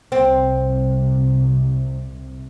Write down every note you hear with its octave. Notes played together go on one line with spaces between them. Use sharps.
C2 C3 C4